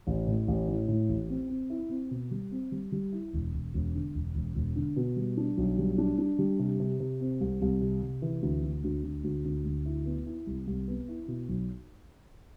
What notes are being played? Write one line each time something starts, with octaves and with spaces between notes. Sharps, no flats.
A1
A2
A1
A2
A2
A1
C4
C4
E4
C4
B2
G3
C4
G3
G3
E4
E1
E1
E1
D3
E1
E1
E1
D3
B2
G3
D4
B1
G3
D4
D4
G3
C3
C3
C3
C4
C2
C2
C3
C3
E3
D2
D2
D2
D2
D2
D2
D2
E4
B3
E4
C2
C2
B3
E4
B2
B1